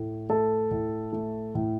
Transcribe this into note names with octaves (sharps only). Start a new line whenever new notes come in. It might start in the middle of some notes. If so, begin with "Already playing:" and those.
Already playing: A2 A3
A3 A4
A2
A3
A2